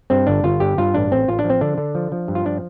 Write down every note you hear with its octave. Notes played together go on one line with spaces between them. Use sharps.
G2 C4
G1 D4
G1 F4
G2 G4
G2 F4
A1 D4
A1 C4
A1 F4
D4
F3
C4
D3 D4
D3
F3
F3
G2
F4
F3 D4